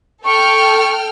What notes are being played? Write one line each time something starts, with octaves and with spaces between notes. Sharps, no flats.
A4 G5 C#6 F6